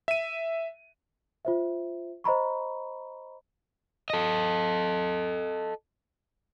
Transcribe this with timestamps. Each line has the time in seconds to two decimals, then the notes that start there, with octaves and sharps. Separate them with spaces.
0.08 E5 D#7
1.45 F4 C5 E5
2.24 C5 D#5 A#5 B5 C#6
4.10 A4 D#5